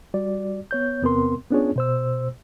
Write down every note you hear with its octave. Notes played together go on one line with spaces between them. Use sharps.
G3 F#4 D5
B3 C#5 G6
E2 C3 B3 C4 A#4 C6
B3 C#4 D4 F4 G#4 C#5
B2 C5 E6